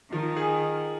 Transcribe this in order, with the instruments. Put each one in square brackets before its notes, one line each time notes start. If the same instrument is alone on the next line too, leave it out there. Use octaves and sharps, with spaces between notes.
[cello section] D#3 [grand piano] F3
[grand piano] G#4